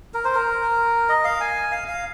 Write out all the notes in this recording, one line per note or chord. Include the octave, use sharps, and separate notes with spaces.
A#4
C5
A#4
D#5
F5
G#5
F5
F5